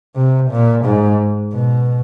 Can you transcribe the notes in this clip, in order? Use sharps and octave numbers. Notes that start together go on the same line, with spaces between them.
C3
A#2
G#2
B2